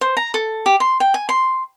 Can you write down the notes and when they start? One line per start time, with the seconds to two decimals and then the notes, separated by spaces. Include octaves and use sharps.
0.01 C5
0.17 A#5
0.34 A4
0.66 G4
0.80 C6
1.00 G5
1.14 G#5
1.29 C6